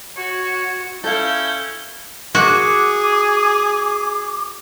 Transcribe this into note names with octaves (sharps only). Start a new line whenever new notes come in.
F#4 C#5
C#4 E4 A4 F5 G6
F#4 G#4 D6